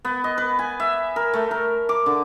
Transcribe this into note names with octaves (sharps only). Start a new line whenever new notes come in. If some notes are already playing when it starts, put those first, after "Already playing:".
B3
D#5
B4
G#5
E5
A#4
A3
A#4
D6
D3